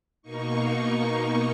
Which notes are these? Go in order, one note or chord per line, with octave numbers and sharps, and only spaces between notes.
B2 A#3 D#4 C#6
C#6